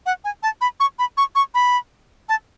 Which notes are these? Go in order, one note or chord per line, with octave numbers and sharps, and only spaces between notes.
F#5
G#5
A5
B5
C#6
B5
C#6
C#6
B5
A5